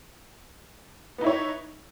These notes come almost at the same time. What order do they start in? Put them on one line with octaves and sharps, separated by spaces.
B3 D#4 E4 C#5